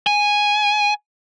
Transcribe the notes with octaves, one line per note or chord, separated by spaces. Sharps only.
G#5